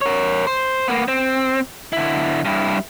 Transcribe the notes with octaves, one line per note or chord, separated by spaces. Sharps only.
A#4 C#5
C5
A#3 B3
C4
D3 E4
G2 E4